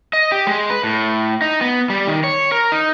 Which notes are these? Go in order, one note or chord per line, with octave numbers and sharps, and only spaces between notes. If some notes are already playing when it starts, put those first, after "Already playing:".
D#5
G4
G#3
B4
A2
D#4
B3
G3
D#3
C#5
A#4
D#4